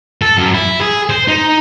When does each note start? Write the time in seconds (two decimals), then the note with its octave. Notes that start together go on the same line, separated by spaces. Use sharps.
0.22 A4
0.38 F#2
0.54 E4
0.81 G#4
1.10 C5
1.28 D#4